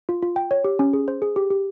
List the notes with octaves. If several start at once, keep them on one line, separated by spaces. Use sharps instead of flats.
F4
F4
G5
C#5
G4
C#4
G#4
C5
G#4
G4
G4